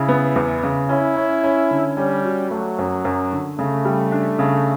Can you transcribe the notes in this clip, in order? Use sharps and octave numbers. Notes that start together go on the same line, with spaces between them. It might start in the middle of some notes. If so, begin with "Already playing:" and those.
Already playing: C#3 E4
B3
E2
C#3
C#4 E4
C#4
C#4
D3
G3 C#4
F#4
F#3 A3
F#2
F#2
D3
C#3 A3
G3
D4
C#3